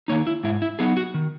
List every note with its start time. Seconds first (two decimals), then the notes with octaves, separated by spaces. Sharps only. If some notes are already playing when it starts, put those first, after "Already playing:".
0.08 D#3 A#3 D#4 C#5
0.27 E4
0.43 G#2 E4
0.62 E4
0.79 F#3 B3 D#4 G#4
0.97 F#4
1.14 D#3